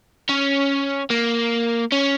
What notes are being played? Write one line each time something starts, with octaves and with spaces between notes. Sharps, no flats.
C#4
A#3
C#4